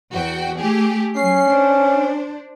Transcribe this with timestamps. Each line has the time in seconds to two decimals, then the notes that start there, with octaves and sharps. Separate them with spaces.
0.11 E2 F#4 G5
0.58 A3 G4 G#4
1.17 F#3 C#4 C7
1.49 D4 C5